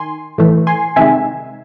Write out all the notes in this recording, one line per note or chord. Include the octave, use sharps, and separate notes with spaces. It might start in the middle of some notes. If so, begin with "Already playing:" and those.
Already playing: D#3 G#5 C6
A2 E3 A3
G#5 C6
C3 D#3 G#3 E5 G#5